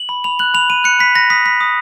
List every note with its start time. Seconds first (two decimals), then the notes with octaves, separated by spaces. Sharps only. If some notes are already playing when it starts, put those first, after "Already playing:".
Already playing: F#7
0.09 B5
0.24 B5 F7
0.39 F#6 F#7
0.54 B5 F7
0.70 B5 D#7
0.84 F#6 C#7
0.99 B5 B6
1.15 B5 A#6
1.30 D#6 B6
1.46 B5 B6
1.61 D#6